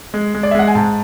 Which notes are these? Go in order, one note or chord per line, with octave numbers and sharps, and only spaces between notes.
G#3
G#3
D5
E5
G#3 F#5
G#5
G#2 A5